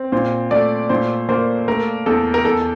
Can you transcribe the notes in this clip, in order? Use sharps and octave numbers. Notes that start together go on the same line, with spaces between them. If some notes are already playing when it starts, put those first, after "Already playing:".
Already playing: C4
A#2 C5
A3 D5
A#2 C5
A#3 C5
A3 A#4
E2 A4
A#4
E2 A4